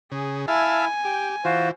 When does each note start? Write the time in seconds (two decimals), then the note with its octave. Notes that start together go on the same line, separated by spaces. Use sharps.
0.12 C#3 G#4
0.48 E4 E5 F5 G#5 A5
1.05 G4 G5
1.45 E3 F4 F#4 C5